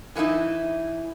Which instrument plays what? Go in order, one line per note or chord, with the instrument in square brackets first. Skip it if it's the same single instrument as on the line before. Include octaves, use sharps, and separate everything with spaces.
[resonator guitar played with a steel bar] E3 G#3 A#3 D#4 E4